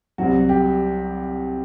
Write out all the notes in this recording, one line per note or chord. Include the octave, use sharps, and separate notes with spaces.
C2 C3 F#3 F#4
G4